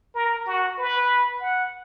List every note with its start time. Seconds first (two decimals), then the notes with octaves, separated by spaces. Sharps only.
0.15 A#4
0.46 F#4
0.78 B4
1.41 F#5